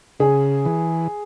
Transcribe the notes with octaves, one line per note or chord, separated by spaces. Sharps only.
C#3 G#4
E3